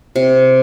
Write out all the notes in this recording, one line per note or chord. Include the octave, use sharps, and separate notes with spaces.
C3